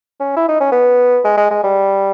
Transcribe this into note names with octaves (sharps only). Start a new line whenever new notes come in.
C#4
E4
D#4
C#4
B3
G#3
G#3
G#3
G3